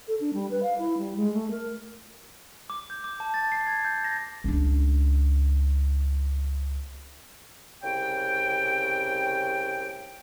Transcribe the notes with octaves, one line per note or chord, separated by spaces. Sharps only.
A4
D4
G3
B4
F5
E4
G3
G#3
A3
A#4
D6
G6
D6
A5
A6
C7
G#6
G6
A#6
C#2 D4
C2 C#3 G5